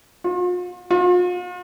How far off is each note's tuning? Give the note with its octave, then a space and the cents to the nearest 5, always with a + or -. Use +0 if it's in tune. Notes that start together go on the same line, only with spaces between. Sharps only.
F4 +45
F4 +45